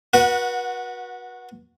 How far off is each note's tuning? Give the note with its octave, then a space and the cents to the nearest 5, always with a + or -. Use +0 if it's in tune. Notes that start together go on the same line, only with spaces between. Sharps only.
F#4 -20 B4 -35 F#5 +0